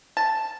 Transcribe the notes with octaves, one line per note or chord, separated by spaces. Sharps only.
A5